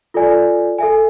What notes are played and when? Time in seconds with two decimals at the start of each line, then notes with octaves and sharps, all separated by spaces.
0.14 F4 A4 D5 G#5
0.78 A4 E5 G#5